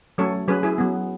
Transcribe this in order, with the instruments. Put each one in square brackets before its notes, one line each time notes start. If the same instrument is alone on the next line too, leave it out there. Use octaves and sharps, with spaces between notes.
[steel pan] F#3 A3 C#4 A4 C#5
F#3 C#4 G#4 B4
E4 G#4
F#3 B3